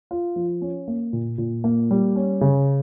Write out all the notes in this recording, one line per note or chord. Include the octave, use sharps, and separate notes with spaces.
F4
F3
C#4
A#3
A#2
A#2
A#3
G3
C#4
C#3